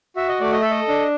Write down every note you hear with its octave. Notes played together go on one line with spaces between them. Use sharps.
F#4 E5
D#5
A3 D5
D#5
A4 E5
D#5
D4